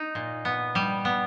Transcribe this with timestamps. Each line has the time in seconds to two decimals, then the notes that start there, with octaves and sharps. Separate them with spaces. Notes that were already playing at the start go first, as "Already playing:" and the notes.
Already playing: D#4
0.15 A#2
0.45 B3
0.75 G3
1.05 B3